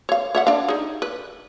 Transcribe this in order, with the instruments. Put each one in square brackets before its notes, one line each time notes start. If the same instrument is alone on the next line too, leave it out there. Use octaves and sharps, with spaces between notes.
[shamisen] C#5 F5
C#5 E5 F#5
D4 F5
D#4 G#4
B4